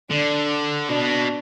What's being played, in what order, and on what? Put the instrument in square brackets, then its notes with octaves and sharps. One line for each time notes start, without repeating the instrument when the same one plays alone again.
[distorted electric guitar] D3 [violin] D4
[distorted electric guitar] B2 [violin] D4